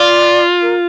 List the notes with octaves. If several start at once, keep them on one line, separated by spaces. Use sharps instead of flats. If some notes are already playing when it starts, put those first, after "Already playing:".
Already playing: F4 D5
A#4